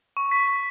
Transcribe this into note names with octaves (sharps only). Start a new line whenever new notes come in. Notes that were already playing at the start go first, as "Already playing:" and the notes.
C#6
B6
B6